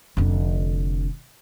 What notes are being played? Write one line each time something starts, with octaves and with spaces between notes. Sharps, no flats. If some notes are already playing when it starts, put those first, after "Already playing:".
F1 D3